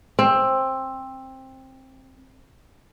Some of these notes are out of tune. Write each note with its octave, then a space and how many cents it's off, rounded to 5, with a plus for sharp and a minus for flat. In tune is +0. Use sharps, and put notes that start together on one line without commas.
C4 +15